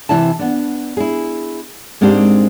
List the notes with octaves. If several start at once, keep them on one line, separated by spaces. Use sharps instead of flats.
C3 E3 E4 E5 A5
B3 D4
E4 G#4
G#2 G#3 A#3 C4 D4 G4